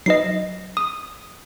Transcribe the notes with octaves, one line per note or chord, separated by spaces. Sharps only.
F#3 D#4 B4 D#5 C7
D#6